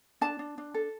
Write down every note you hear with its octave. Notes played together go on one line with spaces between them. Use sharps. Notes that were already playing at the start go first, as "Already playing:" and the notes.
D4 A5
D4
D4
A4